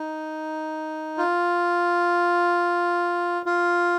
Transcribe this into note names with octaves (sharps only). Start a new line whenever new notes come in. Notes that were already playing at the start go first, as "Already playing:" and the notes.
Already playing: D#4
F4
F4